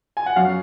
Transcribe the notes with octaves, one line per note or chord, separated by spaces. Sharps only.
G#5
F#5
F#2 F5